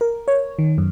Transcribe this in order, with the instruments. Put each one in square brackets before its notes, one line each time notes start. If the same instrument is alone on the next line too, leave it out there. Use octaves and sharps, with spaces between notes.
[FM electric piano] A#4
C#5
D#3
F#2